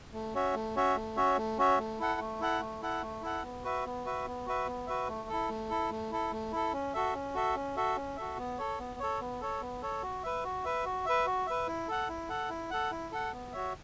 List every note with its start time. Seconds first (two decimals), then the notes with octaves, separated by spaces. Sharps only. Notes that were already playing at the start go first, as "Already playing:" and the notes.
0.13 A3
0.34 C#4 F#4 C#5 E5
0.55 A3
0.76 C#4 F#4 C#5 E5
0.96 A3
1.16 C#4 F#4 C#5 E5
1.37 A3
1.58 C#4 F#4 C#5 E5
1.78 A3
1.99 E4 A4 F#5
2.20 A3
2.40 E4 A4 F#5
2.61 A3
2.82 E4 A4 F#5
3.02 A3
3.22 E4 A4 F#5
3.43 B3
3.64 F#4 B4 E5
3.85 B3
4.05 F#4 B4 E5
4.26 B3
4.46 F#4 B4 E5
4.67 B3
4.87 F#4 B4 E5
5.08 A3
5.29 E4 A4
5.49 A3
5.69 E4 A4
5.90 A3
6.11 E4 A4
6.32 A3
6.52 E4 A4
6.73 C#4
6.94 F#4 A4 E5
7.14 C#4
7.34 F#4 A4 E5
7.55 C#4
7.76 F#4 A4 E5
7.96 C#4
8.17 F#4 A4 E5
8.38 B3
8.58 A4 C#5
8.79 B3
9.00 A4 C#5
9.20 B3
9.41 A4 C#5
9.61 B3
9.82 A4 C#5
10.02 F#4
10.23 B4 E5
10.44 F#4
10.64 B4 E5
10.85 F#4
11.06 B4 E5
11.26 F#4
11.47 B4 E5
11.68 E4
11.88 A4 F#5
12.09 E4
12.29 A4 F#5
12.50 E4
12.71 A4 F#5
12.91 E4
13.12 A4 F#5
13.33 B3
13.53 F#4 C#5 E5